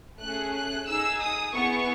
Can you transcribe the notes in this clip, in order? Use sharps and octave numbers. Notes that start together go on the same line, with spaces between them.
A3 C#4 G#4 F#6
F#6
D#4 G#4 E6
D#6
B3 E4 G#4 C#6